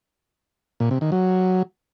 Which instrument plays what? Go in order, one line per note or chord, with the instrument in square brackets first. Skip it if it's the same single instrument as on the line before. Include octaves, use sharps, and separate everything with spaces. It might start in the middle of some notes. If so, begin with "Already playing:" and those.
[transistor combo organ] A#2
C3
D#3
F#3